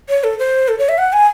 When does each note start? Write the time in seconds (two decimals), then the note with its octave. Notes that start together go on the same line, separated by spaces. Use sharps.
0.09 C#5
0.24 A4
0.39 C5
0.68 A4
0.79 C#5
0.89 E5
0.98 F#5
1.13 G#5